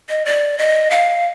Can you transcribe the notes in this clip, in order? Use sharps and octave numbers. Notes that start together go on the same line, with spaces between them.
D#5
D5
D#5
F5